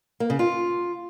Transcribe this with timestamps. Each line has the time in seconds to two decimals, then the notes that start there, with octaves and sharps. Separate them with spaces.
0.20 A#3
0.30 C#3
0.39 F4